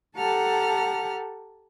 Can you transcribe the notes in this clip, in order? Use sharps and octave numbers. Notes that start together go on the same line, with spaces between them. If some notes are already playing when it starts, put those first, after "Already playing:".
G4 A4 F#5 A5 A#5 F6